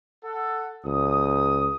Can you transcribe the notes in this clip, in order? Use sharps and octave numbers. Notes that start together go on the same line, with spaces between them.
A4 F#5
C#2 D#6